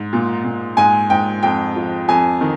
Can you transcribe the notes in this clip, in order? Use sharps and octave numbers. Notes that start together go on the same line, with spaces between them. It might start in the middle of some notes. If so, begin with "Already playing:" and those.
Already playing: G#2
A#2
A#2
G#2 G#5
G#2 G5
F2 G5
F3
F2 G#5
D#3